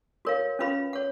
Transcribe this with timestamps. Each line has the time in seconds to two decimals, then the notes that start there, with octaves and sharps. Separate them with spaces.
0.25 F#4 A#4 C#5 F5
0.59 C#4 F4 B4 F5 B5
0.93 C#5 F#5